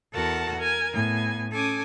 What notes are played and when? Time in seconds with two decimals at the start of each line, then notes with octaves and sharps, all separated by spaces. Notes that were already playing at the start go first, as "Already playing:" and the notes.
0.14 E2 F#4 A4 A#4 F#5 A5
0.57 A#4 G#5
0.93 A2 B3 G#5
1.51 C#4 A4 G#5 D6 D#6